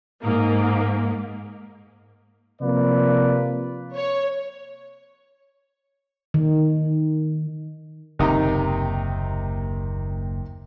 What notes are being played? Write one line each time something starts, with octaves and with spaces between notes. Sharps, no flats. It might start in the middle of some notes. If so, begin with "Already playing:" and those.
G#2 A#3
C3 F3 A#3 B4 D5
C#5
D#3
F#1 D#2 C3 D#3 D#4